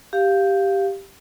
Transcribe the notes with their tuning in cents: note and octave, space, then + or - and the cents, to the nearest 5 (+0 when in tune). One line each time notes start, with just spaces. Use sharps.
G4 +0 F5 +0